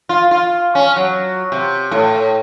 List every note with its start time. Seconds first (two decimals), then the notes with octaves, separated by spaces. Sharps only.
0.09 F4
0.31 F4
0.75 C#4
0.96 F#3
1.52 C3
1.91 A2